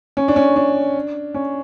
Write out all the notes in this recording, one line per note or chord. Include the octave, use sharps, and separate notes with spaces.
C#4
D4
C#4
D4
C#4